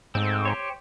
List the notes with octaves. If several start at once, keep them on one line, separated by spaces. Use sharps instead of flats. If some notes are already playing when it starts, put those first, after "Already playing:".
G#2 A3 C4
G4 C5 C#5